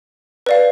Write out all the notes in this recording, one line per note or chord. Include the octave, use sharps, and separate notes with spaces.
B4 D5 F5